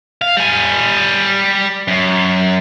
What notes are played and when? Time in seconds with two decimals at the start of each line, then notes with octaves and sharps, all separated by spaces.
0.22 F5
0.37 G3 G#5
1.88 F#2